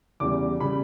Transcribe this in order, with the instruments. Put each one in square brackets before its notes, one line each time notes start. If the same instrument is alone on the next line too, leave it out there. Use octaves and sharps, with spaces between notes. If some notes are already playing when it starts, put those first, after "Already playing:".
[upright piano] E2 C#3 E3 G3 D6
C#3 G3 B5